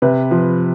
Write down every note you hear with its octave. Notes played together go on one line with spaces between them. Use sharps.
C3 B4
F3